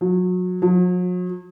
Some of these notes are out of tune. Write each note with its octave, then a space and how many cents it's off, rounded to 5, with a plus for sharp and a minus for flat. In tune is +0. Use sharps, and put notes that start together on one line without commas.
F#3 -30
F#3 -45